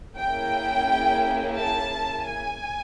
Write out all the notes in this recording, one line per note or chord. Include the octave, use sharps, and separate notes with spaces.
A#3 C#4 E4 G#4 G5
A5
G#5